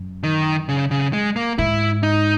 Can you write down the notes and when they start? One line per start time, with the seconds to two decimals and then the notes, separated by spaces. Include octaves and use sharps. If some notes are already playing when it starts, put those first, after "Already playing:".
Already playing: F#2
0.23 D#3
0.69 C#3
0.91 C#3
1.13 G#3
1.36 A#3
1.58 G#2 E4
2.03 D#4